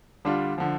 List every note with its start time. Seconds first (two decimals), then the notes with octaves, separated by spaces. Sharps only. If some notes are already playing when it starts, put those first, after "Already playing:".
0.25 D3 G3 D4 F4
0.58 D3 F3